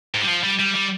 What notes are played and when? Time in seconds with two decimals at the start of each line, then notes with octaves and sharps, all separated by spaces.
0.14 G#2
0.22 G3
0.27 F3
0.43 G3
0.59 G3
0.74 G3